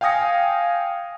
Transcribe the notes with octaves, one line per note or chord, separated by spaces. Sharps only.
F5 G5 G#5 D#6 A#6 C#7